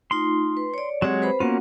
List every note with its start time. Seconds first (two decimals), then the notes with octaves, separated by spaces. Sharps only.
0.11 A3 D#4 F4 C6
0.57 B4
0.74 C#5 D5
1.02 F#3 G#3 C4 G4 C#5 F#5
1.22 B4 C5 B5
1.40 A#3 B3 C#4 F4 F#4 F#5